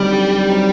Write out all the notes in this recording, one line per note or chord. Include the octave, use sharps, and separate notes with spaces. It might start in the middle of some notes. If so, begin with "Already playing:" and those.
Already playing: D3 F#3 G3 C4 D#4
D3
F#3 C4 D#4